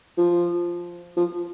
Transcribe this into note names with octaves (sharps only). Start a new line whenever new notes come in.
F3
F3